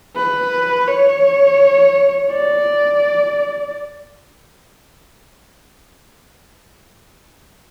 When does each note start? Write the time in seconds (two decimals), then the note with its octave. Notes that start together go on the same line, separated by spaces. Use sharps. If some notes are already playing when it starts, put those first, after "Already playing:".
0.16 B4
0.87 C#5
2.32 D5